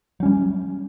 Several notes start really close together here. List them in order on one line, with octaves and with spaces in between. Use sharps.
F#3 C#4 G3